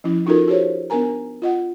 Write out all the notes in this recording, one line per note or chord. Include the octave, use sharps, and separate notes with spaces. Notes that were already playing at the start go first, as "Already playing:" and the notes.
F3 C#4 E4
C#4 D#4 F4 F#4 A4 A#4
F#4 G4 C5 C#5
B3 D4 A#4 G#5 A#5
F4 D#5 F#5